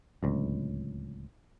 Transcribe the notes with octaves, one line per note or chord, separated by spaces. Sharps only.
D1 C#2